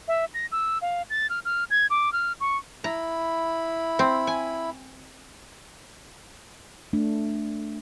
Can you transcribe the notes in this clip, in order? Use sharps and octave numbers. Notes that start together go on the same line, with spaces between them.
E5
A#6
E6
F5
A6
F6
F6
G#6
D6
F6
C#6
E4 A#5 B5
C4
G#5
A3 D4